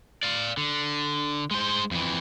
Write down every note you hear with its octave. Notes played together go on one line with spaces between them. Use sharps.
D5 F5
D3
G#3 C5
F2 E3